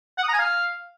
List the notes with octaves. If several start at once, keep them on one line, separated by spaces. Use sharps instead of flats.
F#5
D#6
A#5
G#5
F5